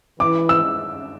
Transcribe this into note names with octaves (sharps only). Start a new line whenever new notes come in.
E3 D6
E6